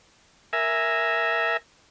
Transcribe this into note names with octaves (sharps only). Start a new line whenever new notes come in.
A#4 E5 G#5